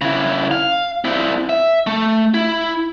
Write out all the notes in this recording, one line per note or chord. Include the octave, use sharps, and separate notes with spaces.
C#3 E4
F5
C4 E4
E5
A3
E4